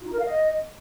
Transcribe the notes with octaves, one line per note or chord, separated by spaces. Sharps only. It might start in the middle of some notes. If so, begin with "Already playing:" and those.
F4
D#4
A#4
F5
D#5